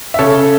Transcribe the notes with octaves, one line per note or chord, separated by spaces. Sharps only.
E5
C#3 A4 C#5